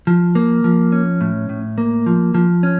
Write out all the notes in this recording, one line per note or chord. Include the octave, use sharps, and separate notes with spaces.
F3
A#3
F3
C#4
A2
A2
A#3
F3
F3
C#4